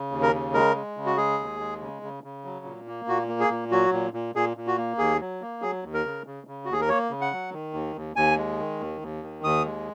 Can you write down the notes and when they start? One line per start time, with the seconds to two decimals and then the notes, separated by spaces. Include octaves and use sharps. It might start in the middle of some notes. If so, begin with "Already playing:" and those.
Already playing: C#3
0.11 D#2
0.22 A#4
0.33 C#3
0.54 G#3 A#4
0.76 G#3
0.97 C#3
1.06 F#4
1.17 G#3 G#4
1.39 D#2
1.60 G#3
1.81 C#3
2.02 C#3
2.24 C#3
2.45 F#3
2.65 A#2
2.88 A#3
3.08 A#2 F#4
3.29 A#3
3.40 G#4
3.50 A#2
3.71 F#3 F#4
3.93 A#2
4.13 A#2
4.35 A#2 G#4
4.57 A#2
4.67 F#4
4.78 A#3
4.98 D#2 G#4
5.20 F#3
5.42 A#3
5.62 F#3 G#4
5.83 D#2
5.94 A#4
6.05 C#3
6.26 C#3
6.47 C#3
6.65 F#4
6.68 D#2 G#4
6.81 A#4
6.89 A#3 C#5
7.10 C#3
7.21 F#5
7.32 F#3
7.52 D#3
7.74 D#2
7.96 D#2
8.16 D#2 G#5
8.37 G#3
8.59 D#3
8.81 D#2
9.01 D#2
9.23 D#3
9.44 D#2 D#6
9.65 G#3